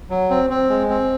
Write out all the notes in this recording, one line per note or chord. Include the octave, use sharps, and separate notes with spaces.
F#3
C4
C4
G#3
C4